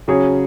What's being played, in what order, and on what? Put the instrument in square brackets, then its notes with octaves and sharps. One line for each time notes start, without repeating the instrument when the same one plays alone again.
[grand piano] C#3 F#3 C#4 G#4 C#5